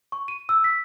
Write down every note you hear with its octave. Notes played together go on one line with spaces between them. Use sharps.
C#6
D#7
E6
B6